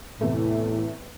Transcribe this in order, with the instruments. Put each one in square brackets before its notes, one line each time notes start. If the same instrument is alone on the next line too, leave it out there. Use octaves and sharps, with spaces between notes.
[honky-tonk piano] E2 C3 E3 A3 [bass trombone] A2